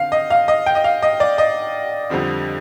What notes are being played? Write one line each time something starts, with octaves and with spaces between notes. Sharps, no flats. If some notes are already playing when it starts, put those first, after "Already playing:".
Already playing: D3 C4 F5
D#5
F5
D#5
G5
D#5
F5
D#5
D5
D#5
F2 D3 G3 C4